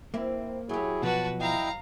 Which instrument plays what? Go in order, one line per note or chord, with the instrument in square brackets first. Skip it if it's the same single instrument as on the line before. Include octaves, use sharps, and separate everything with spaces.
[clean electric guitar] A#3 [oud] C4 E4
[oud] F#3 G4 [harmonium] E4 G#4 C#5
[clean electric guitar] B2 F3 [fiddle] F#4 B4 [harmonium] F#5 A5
[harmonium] E4 D#5 G5 [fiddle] F5 A#5